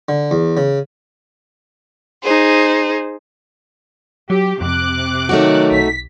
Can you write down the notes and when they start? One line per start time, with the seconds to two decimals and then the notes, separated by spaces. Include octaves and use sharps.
0.09 D3
0.31 E2
0.57 C#3
2.21 D#4 G#4 C5
4.30 F#3 G4
4.61 F2 C3 D6 F#6
5.29 D#3 F#3 A3 D#4 F#4
5.71 B1 B6